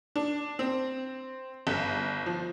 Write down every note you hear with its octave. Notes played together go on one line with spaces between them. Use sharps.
D4
C4
G1
F3